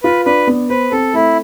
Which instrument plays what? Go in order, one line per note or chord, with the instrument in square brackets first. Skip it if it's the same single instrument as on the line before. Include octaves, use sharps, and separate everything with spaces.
[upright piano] F4 [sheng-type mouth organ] B4
[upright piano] D4 [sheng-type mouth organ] B4
[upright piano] B3
[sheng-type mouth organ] B4 [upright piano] C5
[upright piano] C4 [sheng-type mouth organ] A4
[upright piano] A3 [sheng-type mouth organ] E4